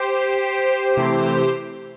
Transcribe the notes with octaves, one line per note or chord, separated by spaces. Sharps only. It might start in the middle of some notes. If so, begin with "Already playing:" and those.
Already playing: G4 C5
C3 E3 A3 C4 E4